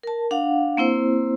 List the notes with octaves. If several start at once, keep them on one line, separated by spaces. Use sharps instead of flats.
A#4 A5
D4 F5 F#5
A#3 C4 E4 C5